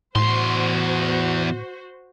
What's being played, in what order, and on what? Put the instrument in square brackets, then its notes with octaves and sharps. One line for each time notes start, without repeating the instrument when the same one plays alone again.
[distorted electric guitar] E2 C6 [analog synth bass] A2 [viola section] F#4 C5